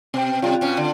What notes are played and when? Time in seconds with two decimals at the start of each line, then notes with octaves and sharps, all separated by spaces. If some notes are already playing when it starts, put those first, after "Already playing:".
0.14 B2 C4 G5
0.42 C3 G3 F4
0.61 B2 C#4
0.77 D3